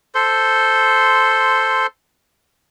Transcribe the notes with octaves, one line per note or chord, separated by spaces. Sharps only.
A4 C5 C6